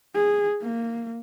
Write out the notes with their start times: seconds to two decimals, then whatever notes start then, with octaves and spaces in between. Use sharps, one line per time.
0.15 G#4
0.62 A#3